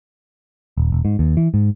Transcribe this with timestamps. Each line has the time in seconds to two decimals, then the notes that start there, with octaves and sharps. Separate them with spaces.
0.77 D#1
0.92 E1
1.05 G#2
1.19 D#2
1.37 E3
1.54 G#2